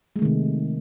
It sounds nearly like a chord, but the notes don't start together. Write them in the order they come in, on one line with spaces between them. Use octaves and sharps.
G#3 A3 D#3 C3